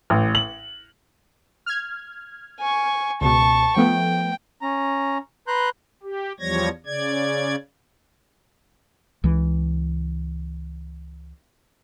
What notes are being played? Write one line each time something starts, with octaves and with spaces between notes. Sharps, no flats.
A1
F#7
F6 G#6
G#5 C#6
C#2 B2 A5 C#6
F3 A3 B3 G5
C#4 A#5
B4 A#5 C6 F#6 G6
G4
E2 F3 G3 C#5 G#6 A#6
C#3 D5 G#6
C#2 E3